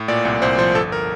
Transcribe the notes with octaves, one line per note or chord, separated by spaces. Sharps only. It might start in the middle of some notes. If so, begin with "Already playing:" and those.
Already playing: A2
A#2 D5
C2
C2 C5
F3 C5
G1 A4
A#4